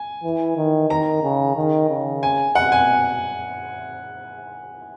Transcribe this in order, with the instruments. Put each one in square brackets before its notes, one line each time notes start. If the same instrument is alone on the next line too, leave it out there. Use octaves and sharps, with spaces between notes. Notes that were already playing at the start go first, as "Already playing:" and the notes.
Already playing: [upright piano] G#5
[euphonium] E3
D#3
[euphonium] D#3 [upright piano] A#5
[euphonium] C#3
D#3
C#3
[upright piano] G#5
[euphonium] B2 [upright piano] F#5
[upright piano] G#5